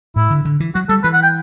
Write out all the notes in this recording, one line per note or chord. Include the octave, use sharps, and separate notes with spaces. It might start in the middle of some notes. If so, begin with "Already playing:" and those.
A2 E4
D3
D3
E3
F#3 F#4
G3 A4
E3 B4
F#5
G5